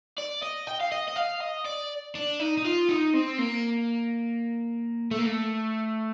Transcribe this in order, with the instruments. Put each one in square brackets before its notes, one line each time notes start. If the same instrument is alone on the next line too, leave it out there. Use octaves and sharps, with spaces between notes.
[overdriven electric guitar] D5
D#5
G5
F5
D#5
D#5
F5
D#5
D5
D4
D#4
D#4
F4
D#4
C4
A#3
A3
A#3
A3